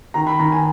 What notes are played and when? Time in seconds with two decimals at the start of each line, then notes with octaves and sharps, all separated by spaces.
0.14 D#3 A#5
0.27 B5
0.39 D#3 A#5
0.52 G#5